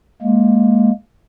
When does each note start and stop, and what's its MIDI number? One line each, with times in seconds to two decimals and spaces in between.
0.22 0.91 56
0.22 0.91 58